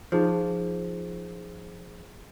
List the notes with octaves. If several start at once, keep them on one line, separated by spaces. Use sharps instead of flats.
F3 D#4 G#4 C5